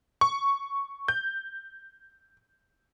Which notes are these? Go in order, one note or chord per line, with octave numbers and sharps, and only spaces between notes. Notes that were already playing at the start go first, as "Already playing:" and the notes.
C#6
G6